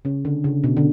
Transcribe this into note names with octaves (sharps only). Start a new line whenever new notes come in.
C#3 C#4
D3
C#3
B2
D3